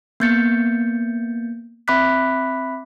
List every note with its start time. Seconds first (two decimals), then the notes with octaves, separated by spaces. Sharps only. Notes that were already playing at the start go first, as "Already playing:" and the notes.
0.20 A#3 B3 G6 A6 C#7
1.88 C4 E5 B5 D6 F#6 B6